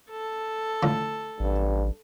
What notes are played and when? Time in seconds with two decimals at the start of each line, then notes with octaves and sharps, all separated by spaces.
0.11 A4
0.83 A2 D3 F3
1.40 A1 G2